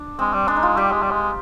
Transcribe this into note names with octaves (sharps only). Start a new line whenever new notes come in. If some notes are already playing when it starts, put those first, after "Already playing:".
Already playing: D4
G#3 C4
G3
G#3 D4
D#4
F4
G3 G4
G#3
G3
G#3